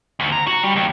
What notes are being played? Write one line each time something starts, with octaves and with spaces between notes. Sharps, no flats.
D2
A#5
F#4
G3
D#2